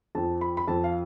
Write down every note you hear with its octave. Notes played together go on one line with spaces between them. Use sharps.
F2 F3 A5
B5
B5
F2 F3 A5
F5